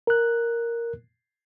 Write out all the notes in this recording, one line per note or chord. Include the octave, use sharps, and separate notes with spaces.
A#4 F#6